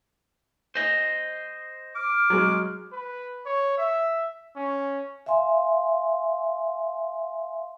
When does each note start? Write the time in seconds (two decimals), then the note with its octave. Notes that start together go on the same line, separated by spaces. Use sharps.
0.75 C5 D#5
1.95 D6 F6
2.30 F#3 G#3
2.93 B4
3.46 C#5
3.78 E5
4.56 C#4
5.26 E5 F5 G#5 C6